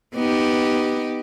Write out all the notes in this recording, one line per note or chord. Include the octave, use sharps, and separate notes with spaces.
B3 D#4 G4